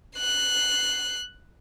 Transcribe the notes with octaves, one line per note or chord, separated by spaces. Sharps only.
F#6 C7